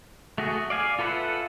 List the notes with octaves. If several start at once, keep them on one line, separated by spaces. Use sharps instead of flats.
A3 F#4 G#4
D5 F5 G#5
F4 A4 B4 E5 F#5